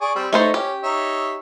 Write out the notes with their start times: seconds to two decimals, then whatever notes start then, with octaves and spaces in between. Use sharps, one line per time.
0.01 G#4 D5 C#6
0.16 G3 C4
0.33 A3 D#4 A4 C5 C#5
0.54 C#4 G4
0.83 D#4 C#5 E5